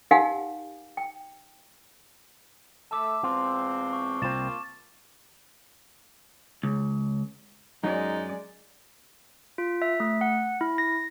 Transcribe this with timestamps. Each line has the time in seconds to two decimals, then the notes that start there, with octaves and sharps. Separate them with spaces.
0.11 D#4 G4 A#4 F5 F#5 G#5
0.97 G5
2.91 A3 E5 A5 D6
3.23 E2 G#3 C4 F4
3.93 C#6
4.22 C2 A#3 C4 F4 A6 E7
6.63 C#2
7.84 F#2 G#3 D#4 D5
9.58 F4
9.82 E5
10.00 A3
10.21 F#5
10.61 E4
10.78 A#6